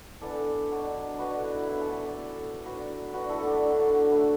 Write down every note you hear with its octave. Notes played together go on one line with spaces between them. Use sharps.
E3 B3 D4 A4 D5
B2 F#3 B3 D4
D3 B3 D4 F#4 B4
E4
E4
A2 E3 B3 E4
A4 D5
F#4 B4
A4 D5
E3 D4
A2 F#3 D4 F#4 B4
D3 A3 D4 F#4 B4
E4 A4
D4 F#4
D3 F#3 A3
A2 A3 D4 E4 A4